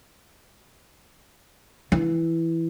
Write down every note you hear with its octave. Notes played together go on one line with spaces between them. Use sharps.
E3